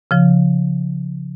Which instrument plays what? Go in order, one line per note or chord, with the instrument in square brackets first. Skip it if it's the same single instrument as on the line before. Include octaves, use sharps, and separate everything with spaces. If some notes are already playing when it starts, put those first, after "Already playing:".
[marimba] C#3 F3